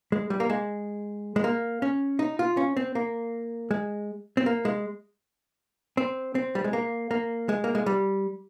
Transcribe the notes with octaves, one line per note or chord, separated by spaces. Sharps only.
G#3
G3
A#3
G#3
G#3
A#3
C#4
D#4
F4
C#4
C4
A#3
G#3
C4
A#3
G#3
C4
C4
G3
G#3
A#3
A#3
G#3
A#3
G#3
G3